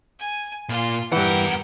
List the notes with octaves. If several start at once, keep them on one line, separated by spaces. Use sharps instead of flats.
G#5
A#2 F4
E2 G2 E3 G4 A#4 F#5